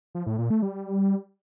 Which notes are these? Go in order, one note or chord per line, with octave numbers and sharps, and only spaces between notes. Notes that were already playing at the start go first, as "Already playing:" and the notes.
F3
A2
A#2
A3
G3